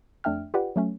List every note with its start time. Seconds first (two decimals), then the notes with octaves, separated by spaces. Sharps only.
0.24 F2 A3 D4 E5 G5 F6
0.54 F4 G4 B4 D5 F#5
0.76 F#3 A3 C#4